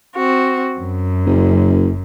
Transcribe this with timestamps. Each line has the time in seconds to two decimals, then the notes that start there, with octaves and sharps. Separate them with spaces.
0.15 C4 F#4
0.78 F#2
1.26 F#1